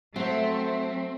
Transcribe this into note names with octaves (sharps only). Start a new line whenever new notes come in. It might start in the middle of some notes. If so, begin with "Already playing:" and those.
F#3 A3 C4 C5